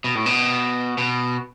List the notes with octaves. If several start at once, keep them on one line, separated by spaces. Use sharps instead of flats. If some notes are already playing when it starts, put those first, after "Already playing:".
B2
A2
B2
B2